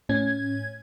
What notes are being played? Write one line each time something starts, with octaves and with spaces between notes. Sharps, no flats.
A2 C#4 G#6